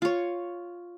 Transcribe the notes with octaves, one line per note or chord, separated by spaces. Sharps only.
F4 C#5